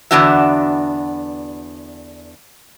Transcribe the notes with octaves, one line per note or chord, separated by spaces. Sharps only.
E2 D3 B3 D4 F#4 E5